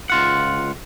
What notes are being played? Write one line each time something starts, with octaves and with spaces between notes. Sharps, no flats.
C#2 F4 F#5